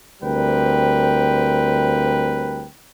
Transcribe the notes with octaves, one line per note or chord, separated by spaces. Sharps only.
D2 G3 C4 A#4 B4 G5